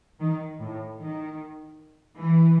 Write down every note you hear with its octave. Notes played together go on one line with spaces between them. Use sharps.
D#3
A2
D#3
E3